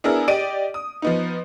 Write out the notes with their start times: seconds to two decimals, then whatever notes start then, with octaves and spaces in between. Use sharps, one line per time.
0.04 B3 D4 E4 G#4 A#4
0.28 G4 D5 D#5 D7 D#7
0.74 D#6
1.02 F3 B3 D#4